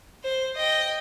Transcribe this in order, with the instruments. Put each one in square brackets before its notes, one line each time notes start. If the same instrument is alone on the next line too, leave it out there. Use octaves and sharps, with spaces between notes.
[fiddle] C5
D#5 G5